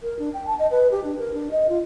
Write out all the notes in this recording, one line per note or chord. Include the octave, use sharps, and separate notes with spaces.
A#4
D4
G5
A5
D#5
B4
G4
D4
A#4
D4
D#5
F4